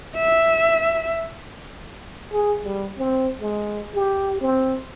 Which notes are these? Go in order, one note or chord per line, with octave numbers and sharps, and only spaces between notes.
E5
G#4
G3
C4
G#3
G4
C4